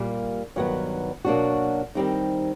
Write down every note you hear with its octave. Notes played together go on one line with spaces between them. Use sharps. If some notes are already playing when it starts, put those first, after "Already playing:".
Already playing: A#2 G3 A#3
G2 D#3 F#3 B3
B2 F#3 A#3 D4 F#4
D#3 G3 C4 D#4